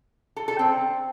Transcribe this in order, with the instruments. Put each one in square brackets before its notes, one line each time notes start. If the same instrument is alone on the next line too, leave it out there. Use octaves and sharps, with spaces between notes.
[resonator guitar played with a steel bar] A4
A4
C4